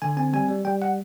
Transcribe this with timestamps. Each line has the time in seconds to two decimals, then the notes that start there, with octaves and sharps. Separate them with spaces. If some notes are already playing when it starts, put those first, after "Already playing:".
0.02 D3 G#5
0.17 C4 G#5
0.33 G3 G#5
0.49 G3
0.65 G3 G5
0.82 F#5